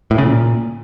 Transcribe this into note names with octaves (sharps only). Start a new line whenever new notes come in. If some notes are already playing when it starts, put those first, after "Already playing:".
A2
C#3
A#2